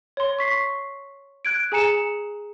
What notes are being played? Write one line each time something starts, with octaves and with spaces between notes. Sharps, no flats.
C#5 C6
C#6 B6 C7
F#6 G#6 D7
G#4 G#5 A#5 C#7 E7